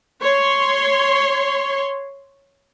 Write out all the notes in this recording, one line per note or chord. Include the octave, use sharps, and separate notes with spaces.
C#5 C6